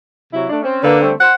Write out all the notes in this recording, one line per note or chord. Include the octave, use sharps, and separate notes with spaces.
C3 F#3 E4
A3 D4
C4 C#4
D3 A#3 B4
G3 A3 C4
C5 F#5